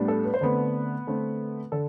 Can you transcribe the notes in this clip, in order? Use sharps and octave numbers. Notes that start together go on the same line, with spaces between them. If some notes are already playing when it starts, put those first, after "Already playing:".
Already playing: A2 G3 B3 D4
A4
B4
C5
D3 A3 B3 C4 B4
D3 A3 C4
D3 A4